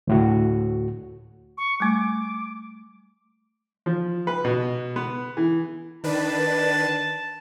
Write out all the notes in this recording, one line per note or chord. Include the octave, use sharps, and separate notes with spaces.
D2 A2 F#4
C#6
G3 A3 D6
F3
B4
B2
B3
E3
D#3 D4 B4 A5